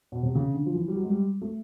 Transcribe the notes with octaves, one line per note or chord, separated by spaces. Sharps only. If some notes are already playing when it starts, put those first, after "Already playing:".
B2
C3
C#3
D3
F3
E3
G3
F#3
G#3
G3
A3